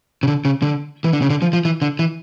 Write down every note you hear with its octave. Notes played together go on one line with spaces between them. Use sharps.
C#3
D3
C#3
D3
E3
D3
C#3
D3
F3
F3
E3
D3
E3